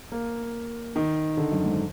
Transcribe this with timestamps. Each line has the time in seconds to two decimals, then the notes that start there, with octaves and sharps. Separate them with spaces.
0.12 A#3
0.96 D#3
1.37 D3
1.52 F#2
1.66 G#2